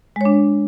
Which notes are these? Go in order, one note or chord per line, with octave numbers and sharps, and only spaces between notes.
G#3 D4 C#5